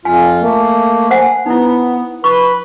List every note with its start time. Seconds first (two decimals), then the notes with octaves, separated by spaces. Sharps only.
0.05 F2 F4 G#5
0.42 A3 A#3
1.11 C5 F#5 G#5
1.46 B3 D#4 E4
2.24 B4 C#6